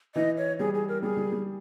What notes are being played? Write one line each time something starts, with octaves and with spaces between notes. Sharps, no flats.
E3 D#5
C#5
G3 G#4
G#4
A#4
G3 G#4
G3
G3